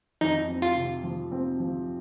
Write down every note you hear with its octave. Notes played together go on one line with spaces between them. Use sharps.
F2 D#4
C4
F4
C3
F3
C4
F3